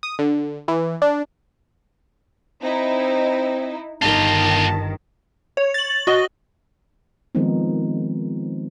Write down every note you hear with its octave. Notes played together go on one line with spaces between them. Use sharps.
D#6
D3
E3
D4
C4 D#4 E4
G1 D#3 F4 G4 A5
C#5
A6 F#7
F#4 D#5
D#3 F3 G#3 B3 C4 D#4